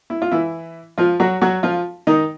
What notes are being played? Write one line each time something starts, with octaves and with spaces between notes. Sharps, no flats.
E4
F4
E3 E4
F3 F4
F#3 F#4
F#3 F#4
F3 F4
D#3 D#4